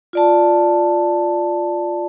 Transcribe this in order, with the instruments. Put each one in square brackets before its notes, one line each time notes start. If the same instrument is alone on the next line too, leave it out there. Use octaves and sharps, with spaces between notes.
[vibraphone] F4 D5 A5